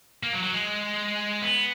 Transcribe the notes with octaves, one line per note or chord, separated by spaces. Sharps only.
A#3
F#3
F#3
G#3
B3